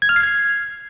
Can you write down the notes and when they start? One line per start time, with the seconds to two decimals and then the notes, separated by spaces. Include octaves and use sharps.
0.02 G#6
0.09 F6
0.16 C7
0.23 G#6